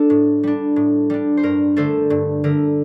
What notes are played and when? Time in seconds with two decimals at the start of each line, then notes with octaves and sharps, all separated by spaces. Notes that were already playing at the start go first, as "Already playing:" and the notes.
Already playing: D4 A4
0.10 A2
0.43 G3 D4
0.76 A2
1.10 G3 D4
1.37 C5
1.43 G2 A#4
1.76 D3 A3 A4 C5
2.10 G2
2.44 D3 A3 A#4